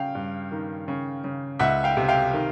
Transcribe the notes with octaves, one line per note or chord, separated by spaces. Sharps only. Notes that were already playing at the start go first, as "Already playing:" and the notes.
Already playing: C#3 F5 G5
G2
D#3
C#3
C#3
C#2 E5 F#5
F5 G5
C3
F5 G5
D#3